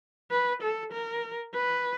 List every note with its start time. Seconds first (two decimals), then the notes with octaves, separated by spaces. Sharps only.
0.31 B4
0.62 A4
0.92 A#4
1.54 B4